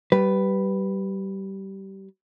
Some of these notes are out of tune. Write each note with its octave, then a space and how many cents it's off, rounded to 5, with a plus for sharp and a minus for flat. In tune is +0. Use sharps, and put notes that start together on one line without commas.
G3 -20 B4 +0